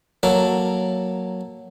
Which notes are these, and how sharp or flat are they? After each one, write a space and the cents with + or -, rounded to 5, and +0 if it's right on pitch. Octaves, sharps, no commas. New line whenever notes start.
F#3 +0 A#3 +0 A4 +0